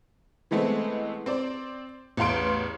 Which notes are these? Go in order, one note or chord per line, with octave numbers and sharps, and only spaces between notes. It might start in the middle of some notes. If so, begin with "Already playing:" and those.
E3 G#3 A3 B3 C4
C4 C5 D5
A1 E2 F5 C6 D7